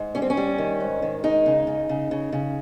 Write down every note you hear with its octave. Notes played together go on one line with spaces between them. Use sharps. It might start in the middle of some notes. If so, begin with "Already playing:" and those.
Already playing: G#2
G3 C#4
C4
C#4
G3
D#3
G#2
D#3
G#3 D#4
C#3
C#3
C#3
C#3
C#3